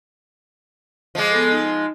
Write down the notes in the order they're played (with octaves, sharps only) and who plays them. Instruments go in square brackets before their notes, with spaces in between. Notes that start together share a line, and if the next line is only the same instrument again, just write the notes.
[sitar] F3 G#3 [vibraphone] D#5 D6
[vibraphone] B3 A4
D#4 D#5